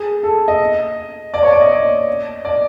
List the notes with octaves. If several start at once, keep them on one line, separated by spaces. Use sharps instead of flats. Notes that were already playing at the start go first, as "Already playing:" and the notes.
Already playing: G#4
A4
D#5
D5
C#5
D5
D#5
D5